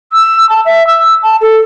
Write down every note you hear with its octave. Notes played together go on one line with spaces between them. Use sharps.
E6
A5
E5
E6
A5
A4